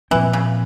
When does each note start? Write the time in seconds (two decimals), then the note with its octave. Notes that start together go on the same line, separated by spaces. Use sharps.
0.11 A#2 E3 F3 C4
0.33 C#3